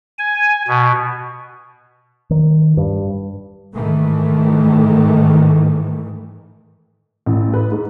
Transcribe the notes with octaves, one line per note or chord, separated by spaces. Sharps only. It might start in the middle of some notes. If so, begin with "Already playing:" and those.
G#5
B2
D#3
G2
G#2 D#3 E3 A3
A1
B4
G#2